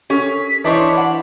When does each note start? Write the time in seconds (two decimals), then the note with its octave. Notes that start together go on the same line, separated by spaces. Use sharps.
0.10 C#4 G4 A4 A#4 B6
0.64 E3 D4 D#4 C5 C#5
0.93 B4 F#5 B5